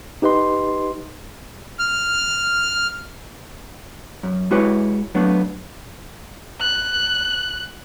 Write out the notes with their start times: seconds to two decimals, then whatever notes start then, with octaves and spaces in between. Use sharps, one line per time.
0.22 D#4 G4 B4 D#5 C6
1.79 F6
4.23 F#2
4.51 G#3 E4 F#4 G4 B4 C#5
5.15 F#3 A3 B3 D4
6.60 F#6